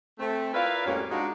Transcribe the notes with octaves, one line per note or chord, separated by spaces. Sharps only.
A3 C4
E4 F4 A#4 B4 D5 F5
F2 A2 G3 A#3 C#4 F#4
G#3 D4 D#4 F4 F#4